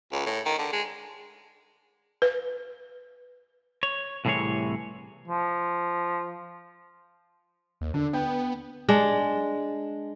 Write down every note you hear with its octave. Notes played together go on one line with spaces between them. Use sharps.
C#2
A2
D#3
D3
G#3
B4
C#5
C2 A2 C3 E3 G#4 C#5
F3
D#2
D3 D4
B3 G5
G#3 D4